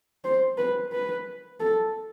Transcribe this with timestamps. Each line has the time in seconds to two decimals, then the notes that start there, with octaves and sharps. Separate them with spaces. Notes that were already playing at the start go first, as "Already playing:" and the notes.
0.25 C5
0.58 B4
0.92 B4
1.60 A4